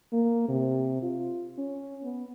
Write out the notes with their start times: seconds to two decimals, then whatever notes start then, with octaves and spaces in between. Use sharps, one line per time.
0.13 A#3
0.48 C3
1.02 F4
1.58 C#4
2.03 B3